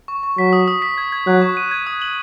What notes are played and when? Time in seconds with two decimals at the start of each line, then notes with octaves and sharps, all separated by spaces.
0.08 C#6
0.23 C#6
0.38 F#3 B6
0.53 D#6
0.68 D#6
0.82 B6
0.98 G#6
1.12 G#6
1.27 F#3 F#6
1.42 C#6
1.57 D#7
1.71 G#6
1.87 D#6
2.02 F#7